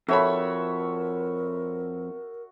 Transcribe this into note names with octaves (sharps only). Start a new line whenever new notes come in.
F2 F#4 A4 A#4 C#5 E5 B5